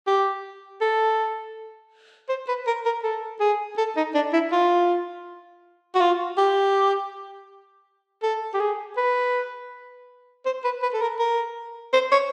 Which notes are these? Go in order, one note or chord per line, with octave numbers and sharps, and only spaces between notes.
G4
A4
C5
B4
A#4
A#4
A4
G#4
A4
D#4
D4
E4
F4
F#4
F4
G4
A4
G4
G#4
B4
C5
B4
B4
A4
A#4
A#4
C5
C#5